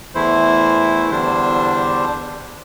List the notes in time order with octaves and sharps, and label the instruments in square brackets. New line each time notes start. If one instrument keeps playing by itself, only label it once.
[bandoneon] E2 E3 A3 E4 C5
E2 D3 G3 D4 C5